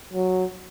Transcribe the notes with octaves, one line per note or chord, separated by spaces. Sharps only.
F#3